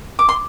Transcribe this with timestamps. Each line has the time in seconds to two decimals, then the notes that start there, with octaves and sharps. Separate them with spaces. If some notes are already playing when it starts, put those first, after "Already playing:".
0.19 D6
0.29 C6